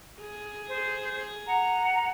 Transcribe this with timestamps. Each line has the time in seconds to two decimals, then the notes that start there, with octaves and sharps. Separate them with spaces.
0.20 G#4
0.68 C5
1.46 F#5 A#5